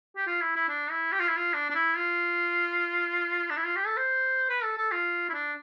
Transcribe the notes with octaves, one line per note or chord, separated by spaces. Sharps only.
G4
F4
E4
E4
D4
E4
G4
F4
E4
F4
D4
D4
E4
F4
D4
E4
F4
G4
A4
C5
B4
A4
A4
F4
E4
D4